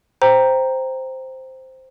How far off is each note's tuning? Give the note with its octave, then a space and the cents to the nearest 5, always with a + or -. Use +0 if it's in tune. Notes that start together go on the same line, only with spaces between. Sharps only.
C5 +0 G5 +0 A#5 +0